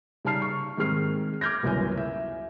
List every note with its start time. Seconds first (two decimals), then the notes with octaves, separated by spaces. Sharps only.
0.25 C#3 G3 D#4 A5 F6 C7
0.42 C#6
0.77 G#2 D#3 C4 G#4 F6 C7
1.41 D6 F6 G6 G#6 A#6
1.63 G1 C#2 F#2 E4 C#5 G#5
1.97 E5